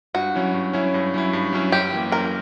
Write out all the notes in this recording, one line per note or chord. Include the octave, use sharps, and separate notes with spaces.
G2 F#4
F#3 C#4 E4
G2
F#3 C#4 E4
G2
F#3 C#4 E4
G2
F#3 C#4 E4
F#2 G4
E3 A#3
F#2 A#4